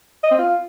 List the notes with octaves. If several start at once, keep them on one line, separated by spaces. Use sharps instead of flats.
D#5
C4
F4